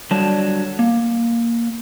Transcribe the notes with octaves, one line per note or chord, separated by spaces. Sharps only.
D3 F#3 G3 A5
A#3